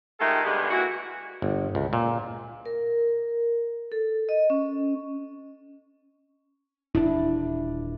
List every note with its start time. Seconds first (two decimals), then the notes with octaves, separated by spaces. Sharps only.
0.19 D#3 G#3 A3 F4 G4 A4
0.44 G2 B2 D3 D#3 G#3
0.70 E3 A#3 E4 F#4
1.42 G1
1.75 C#2
1.93 A#2
2.66 A#4
3.92 A4
4.29 D#5
4.50 C#4
6.95 D#1 D4 E4